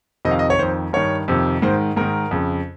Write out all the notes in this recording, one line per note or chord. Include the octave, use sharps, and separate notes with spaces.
F2 C3 D#3 D#5
F5
D#5
C#5
F2 D#3 C5
G2 D#3 C#5
F2 C3 D#3
G#2 D#3 C5
G#2 D#3 A#4
F2 C#3